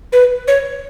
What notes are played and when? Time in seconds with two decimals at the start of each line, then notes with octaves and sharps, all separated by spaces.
0.13 B4
0.48 C#5